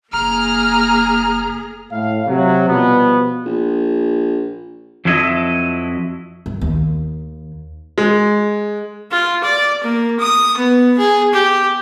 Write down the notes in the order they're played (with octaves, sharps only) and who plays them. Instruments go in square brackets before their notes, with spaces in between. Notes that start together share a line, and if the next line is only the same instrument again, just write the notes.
[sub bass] F#1 [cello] A#3 G#4 [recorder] A#5 [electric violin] F6
[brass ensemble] A2 F5
C3 F#3
B2 F3 G3 B3
[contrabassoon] A#1
[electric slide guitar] F2 F3 F#3 E4 A4 D#5
[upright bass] G2
D#2
[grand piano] G#3
[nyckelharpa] F4
D5
A#3
D#6
B3
G#4
G4